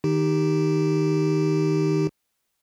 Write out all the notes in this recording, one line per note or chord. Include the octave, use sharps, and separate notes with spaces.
D#3 D#4 G4